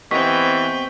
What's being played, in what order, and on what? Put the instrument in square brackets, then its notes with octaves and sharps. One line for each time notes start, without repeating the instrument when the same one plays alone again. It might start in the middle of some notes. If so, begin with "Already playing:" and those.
[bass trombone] E3 [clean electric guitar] B3 G4 D#5 [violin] C4 G5 [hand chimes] C#6 B6